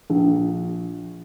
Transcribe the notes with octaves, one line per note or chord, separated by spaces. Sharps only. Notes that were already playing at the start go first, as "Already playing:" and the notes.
A#1